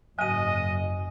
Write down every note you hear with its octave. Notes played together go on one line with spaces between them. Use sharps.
F#1 G#2 F#3 D#5 G#5 D#7